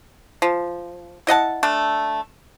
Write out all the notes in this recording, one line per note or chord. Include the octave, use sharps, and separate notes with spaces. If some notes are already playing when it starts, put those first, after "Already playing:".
F3
E4 D#5 F#5 A5
A3 D4